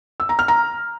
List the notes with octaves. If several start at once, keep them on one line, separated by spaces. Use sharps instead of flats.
E6
A#5
F6
A#5